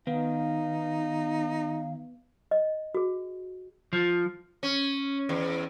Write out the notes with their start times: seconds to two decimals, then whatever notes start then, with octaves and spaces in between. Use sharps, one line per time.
0.07 D#3 B3 D#4 F5
2.51 D#5
2.95 F#4 G#4
3.93 F3
4.63 C#4
5.29 E2